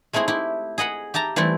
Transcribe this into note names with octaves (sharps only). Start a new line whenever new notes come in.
G#3 A3 C4 E4 G#4
E4 G4
G#4 D#5 F#5 B5
G4 E5 A5 A#5
E3 G3 A3 C4 E4